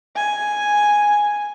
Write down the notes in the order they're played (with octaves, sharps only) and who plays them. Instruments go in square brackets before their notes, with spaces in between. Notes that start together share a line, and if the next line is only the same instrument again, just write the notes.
[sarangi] G#5